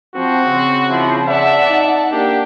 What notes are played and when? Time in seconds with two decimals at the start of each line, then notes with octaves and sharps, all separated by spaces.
0.15 F3 C4 F#4
0.46 C#3 C4
0.90 F3 E4
1.28 D5 E5 F#5 A5
1.70 D#4
2.12 A#3 D4 G4